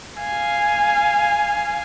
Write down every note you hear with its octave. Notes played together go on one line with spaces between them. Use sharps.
F5 G#5